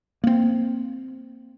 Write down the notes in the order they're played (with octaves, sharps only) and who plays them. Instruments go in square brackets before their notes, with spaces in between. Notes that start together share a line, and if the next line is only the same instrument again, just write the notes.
[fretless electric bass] A#3 C4